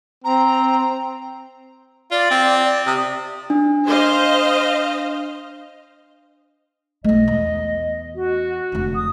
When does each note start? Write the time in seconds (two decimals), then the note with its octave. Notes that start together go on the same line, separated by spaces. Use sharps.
0.24 C4 A#5
2.11 F4 D5
2.31 C4
2.65 D5
2.86 C3 D#6
3.50 D4
3.86 C5 D#5 F5
7.04 B1 A3 D#5
7.28 E2
8.15 F#4
8.72 F1 D3
8.95 D#6